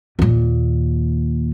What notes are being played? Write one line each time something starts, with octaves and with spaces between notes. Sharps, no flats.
D#2 A#2